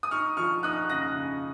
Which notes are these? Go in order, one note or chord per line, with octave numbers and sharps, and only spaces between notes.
D#6
D#4 C#6 F6
F3 C#6 F6
D#4 D#6 F#6
C#3 F#6 A#6
C#3